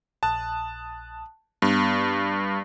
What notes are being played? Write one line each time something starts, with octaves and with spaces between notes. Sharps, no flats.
A#1 A5 D#6 F#6
G2 B3 B5